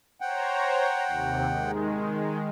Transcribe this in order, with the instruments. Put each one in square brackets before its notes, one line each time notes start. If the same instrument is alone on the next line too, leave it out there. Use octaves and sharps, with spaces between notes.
[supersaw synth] C5 C#5 A#5 [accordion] F#5 G5
[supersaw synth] D#2 C3
D#3 G#3